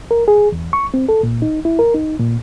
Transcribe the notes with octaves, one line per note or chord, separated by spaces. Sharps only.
A#4
G#4
E2
C#6
C4
A4
A#2
D#4
E4
A#4
D#4
A#2